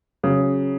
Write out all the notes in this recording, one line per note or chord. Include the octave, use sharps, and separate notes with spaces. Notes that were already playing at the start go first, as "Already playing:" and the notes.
C#3 F#3